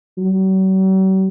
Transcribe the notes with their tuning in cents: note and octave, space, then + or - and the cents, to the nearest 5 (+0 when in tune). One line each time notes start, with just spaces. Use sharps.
F#3 +45